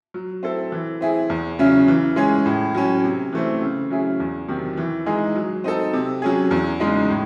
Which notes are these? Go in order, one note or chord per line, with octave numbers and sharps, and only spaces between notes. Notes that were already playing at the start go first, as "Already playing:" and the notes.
F#3
C4 E4 A4
E3
C4 E4 G#4
E2
C#3 F#3 C#4 E4
E3
G#3 C#4 G#4
A2
F#3 C#4
C3
E3 A3 C4
C#3
F#3 C#4 E4 G#4
E2
C3 D#3 F#3
E3
G#3 D#4 G#4
F#3
C4 D#4 A4
C3
F#3 C#4 G#4
E2
C#3 G#3 D#4
A2